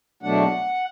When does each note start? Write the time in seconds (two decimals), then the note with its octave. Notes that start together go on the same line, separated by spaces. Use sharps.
0.23 E2 B2 F#3 A3 D4 F#5